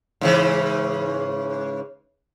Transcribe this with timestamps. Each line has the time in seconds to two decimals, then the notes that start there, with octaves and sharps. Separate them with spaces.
0.21 G#2 C#3 E3